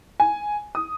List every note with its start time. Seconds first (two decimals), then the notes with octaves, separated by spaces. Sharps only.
0.20 G#5
0.75 D#6